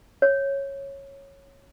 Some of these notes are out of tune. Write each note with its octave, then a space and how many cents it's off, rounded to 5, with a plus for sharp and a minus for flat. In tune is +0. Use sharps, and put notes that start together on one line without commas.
C#5 -10